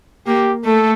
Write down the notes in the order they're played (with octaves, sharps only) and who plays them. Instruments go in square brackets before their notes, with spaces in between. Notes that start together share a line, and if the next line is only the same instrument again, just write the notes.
[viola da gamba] A#3 [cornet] G4
[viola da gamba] A3 [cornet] A4